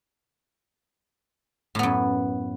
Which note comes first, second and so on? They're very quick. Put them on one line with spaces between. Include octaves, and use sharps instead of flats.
A2 B3 F#2